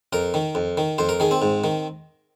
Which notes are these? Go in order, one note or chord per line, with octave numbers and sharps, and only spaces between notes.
F2 A#4
D#3
F2
D#3
F2 C5
A#4
D#3 G#4
C4
G#2
D#3